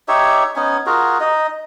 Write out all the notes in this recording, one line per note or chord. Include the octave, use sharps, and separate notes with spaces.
D#4 G4 C#5 E5
B3 C#4 D#4 G#5
F4 F#4 G#4 A#4
D#4 D#5